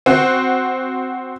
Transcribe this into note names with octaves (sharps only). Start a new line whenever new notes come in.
C4 F#4